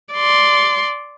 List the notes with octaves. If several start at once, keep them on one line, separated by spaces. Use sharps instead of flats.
D5 C6